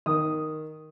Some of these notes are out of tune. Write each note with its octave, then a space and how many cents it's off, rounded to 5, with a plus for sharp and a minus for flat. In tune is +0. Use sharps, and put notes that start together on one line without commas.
D#3 +0 D#6 +0